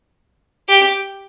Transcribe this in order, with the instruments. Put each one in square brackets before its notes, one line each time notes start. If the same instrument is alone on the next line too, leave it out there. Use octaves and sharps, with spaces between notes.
[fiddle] G4